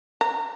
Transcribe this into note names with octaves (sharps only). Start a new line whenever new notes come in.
A#5